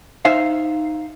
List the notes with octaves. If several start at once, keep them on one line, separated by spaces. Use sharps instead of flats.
D#4 C5 E5 F5